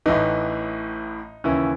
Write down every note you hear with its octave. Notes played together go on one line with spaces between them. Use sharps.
A1 A2 E3 D#4
D#2 C#3 E3 C#4 E4